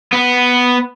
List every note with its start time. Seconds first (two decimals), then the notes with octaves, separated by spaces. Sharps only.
0.13 B3